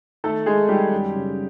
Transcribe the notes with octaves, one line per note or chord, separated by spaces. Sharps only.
D#3 A3 A4
D#3 G#3 G#4
D#3 G3 G4
F#2
C#3